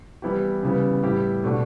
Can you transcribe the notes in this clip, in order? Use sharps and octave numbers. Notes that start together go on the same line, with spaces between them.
E3 G3 B3 E4 G4
C#3 E3 G3 B3
A2 G3 B3 E4 G4
B2 A3 D4 F#4